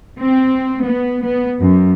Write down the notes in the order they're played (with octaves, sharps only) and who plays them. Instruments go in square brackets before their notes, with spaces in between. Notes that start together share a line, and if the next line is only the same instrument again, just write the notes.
[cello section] C4
B3
B3
F#2